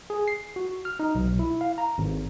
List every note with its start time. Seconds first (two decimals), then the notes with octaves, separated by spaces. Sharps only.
0.10 G#4
0.28 C7
0.56 F#4
0.85 F6
0.99 D#4
1.15 B1
1.39 E4
1.61 F5
1.78 A#5
1.98 G#1